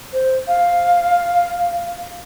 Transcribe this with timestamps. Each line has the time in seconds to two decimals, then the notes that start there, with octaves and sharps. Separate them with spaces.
0.13 C5
0.48 F5